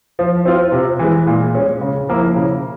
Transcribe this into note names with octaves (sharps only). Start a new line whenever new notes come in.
F3
C4 F4
C3
E3 G#3
A#2
G#3 C#4
C#3
F3 A#3 E4
C#3